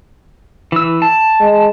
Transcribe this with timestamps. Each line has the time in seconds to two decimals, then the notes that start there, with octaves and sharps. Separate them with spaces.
0.72 E3 E6
1.02 A5
1.40 G#3